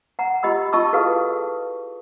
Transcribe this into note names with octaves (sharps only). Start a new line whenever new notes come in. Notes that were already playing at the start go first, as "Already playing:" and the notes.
F#5 A#5
F4 G4 D#5 B5 E6
F4 D#5 A5 C#6 E6
E4 F#4 G#4 A4 B4 F5